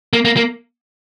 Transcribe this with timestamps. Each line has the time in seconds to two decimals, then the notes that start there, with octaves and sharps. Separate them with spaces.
0.13 A#3
0.25 A#3
0.37 A#3